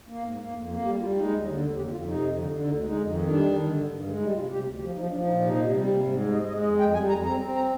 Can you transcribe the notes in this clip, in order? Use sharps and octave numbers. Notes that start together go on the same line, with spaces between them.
A#3
G#2
A#3
F2
A#3
G3 G4
G3 F4
G#3 D#4
D#2
D3
D#2
F2 G4
F2 F4
C3 D#4
F2
D3
D3
D2 D#4
G#3 D#4
F2
D#3
G3 D4
D#3
D3
G2
G2
G#3
G3 D#4
C3 F4
C3 G4
D2
F3 G4
F3 D#4
F3 D4
A#2 D#4
C3 D#4
C3
G3
C3
G#2
G#3
G#3 D#5
G#3 D#5
F2 D#5
F2 G5
G3 G#5
F2 A#5
C4 A#5
C4
A#5